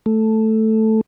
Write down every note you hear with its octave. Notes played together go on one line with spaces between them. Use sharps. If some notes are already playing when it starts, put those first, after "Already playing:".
A3